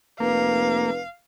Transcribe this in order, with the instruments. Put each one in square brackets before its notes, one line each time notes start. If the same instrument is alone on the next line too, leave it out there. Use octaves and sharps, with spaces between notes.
[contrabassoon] F1 [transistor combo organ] A#3 [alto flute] B4 [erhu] F5